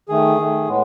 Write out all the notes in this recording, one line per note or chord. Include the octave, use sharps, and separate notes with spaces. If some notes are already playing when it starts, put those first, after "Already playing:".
D#3 A3 G#4
D#3 A3
A2 G#3 B3